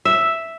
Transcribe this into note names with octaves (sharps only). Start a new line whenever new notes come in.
E5